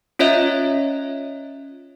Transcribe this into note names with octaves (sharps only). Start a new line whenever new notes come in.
C#4 F4 C#5 D#5 E5